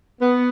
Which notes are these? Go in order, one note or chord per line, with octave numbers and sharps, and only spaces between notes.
B3